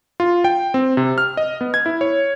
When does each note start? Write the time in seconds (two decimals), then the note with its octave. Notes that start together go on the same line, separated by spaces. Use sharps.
0.20 F4
0.44 G5
0.74 C4
0.97 C3
1.18 F6
1.37 D#5
1.61 B3
1.74 G#6
1.86 E4
2.01 C#5